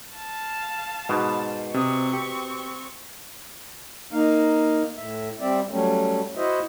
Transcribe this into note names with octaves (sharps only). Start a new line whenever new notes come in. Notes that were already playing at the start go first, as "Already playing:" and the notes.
F5 A5
G#2 B2
C3 C4 C#6 D#6
G4
A#3 D#4 F5
A2 E5
G3 C4 D5 E5
F#3 G3 A3 C#4
E4 F#4 C5 D#5 E5